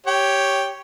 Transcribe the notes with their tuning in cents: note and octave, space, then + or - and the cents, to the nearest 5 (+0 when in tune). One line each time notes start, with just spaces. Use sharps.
G4 +0 C#5 +0 G5 +0